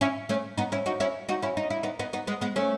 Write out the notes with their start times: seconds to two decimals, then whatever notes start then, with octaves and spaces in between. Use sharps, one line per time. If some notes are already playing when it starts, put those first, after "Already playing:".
0.01 C#4 E4
0.29 A3 C#4
0.57 B3 D#4
0.72 C#4 E4
0.86 D#4 F#4
1.00 C#4 E4
1.29 D#4 F#4
1.42 C#4 E4
1.57 D#4
1.70 E4
1.83 B3 D#4
1.99 B3 D#4
2.13 B3 D#4
2.27 G#3 B3
2.41 G#3 B3
2.56 A3 C#4